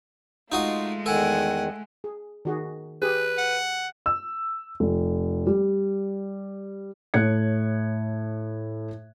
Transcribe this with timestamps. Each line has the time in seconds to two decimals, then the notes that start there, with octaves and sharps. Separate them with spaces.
0.52 G#3 A3 D#4 F4 F#4 D#5
1.06 E2 D#3 A4 F#5 G#5
2.04 G#4
2.45 D#3 F#4 G#4
3.02 G4 G#4 B4
3.38 F#5
4.06 E6
4.80 F1
5.47 G3
7.14 A2 C#5 F#6 G#6 C#7